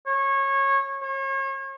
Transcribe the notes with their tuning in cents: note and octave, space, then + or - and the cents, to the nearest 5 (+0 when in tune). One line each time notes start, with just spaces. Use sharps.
C#5 -20
C#5 -40